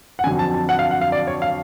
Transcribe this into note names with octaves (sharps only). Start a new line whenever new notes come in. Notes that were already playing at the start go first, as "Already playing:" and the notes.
F#5
F2 D3 F#3 G#5
A5
A5
F#5
F5
F#5
F5
D5
C#5
F5